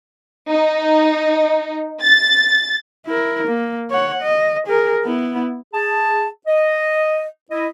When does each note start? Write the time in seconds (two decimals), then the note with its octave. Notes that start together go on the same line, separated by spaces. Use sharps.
0.48 D#4
2.02 A6
3.06 E4 A#4
3.47 A#3
3.91 C#5 F#5
4.22 D#5
4.67 G#4 A#4
5.05 B3 E4
5.74 G#4 A5
6.47 D#5
7.51 E4 D#5